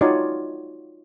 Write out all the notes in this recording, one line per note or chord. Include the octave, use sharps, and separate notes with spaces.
D#4 F4 F#4 C#5 D5 G#5